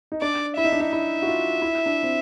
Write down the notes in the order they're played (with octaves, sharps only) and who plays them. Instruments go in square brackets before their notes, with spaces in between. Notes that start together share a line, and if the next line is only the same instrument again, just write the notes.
[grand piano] D#4
[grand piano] D4 [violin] D5
[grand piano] E4 [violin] E5
[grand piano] D#4
D4
D#4
[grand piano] E4 [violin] E5
[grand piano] F#4
F4
E4
D4
C4